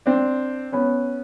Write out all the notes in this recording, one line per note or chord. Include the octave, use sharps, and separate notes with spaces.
C4 D4
B3 C#4